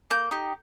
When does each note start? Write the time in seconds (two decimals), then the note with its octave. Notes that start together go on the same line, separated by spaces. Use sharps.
0.10 A#3 G6
0.31 D#4 G4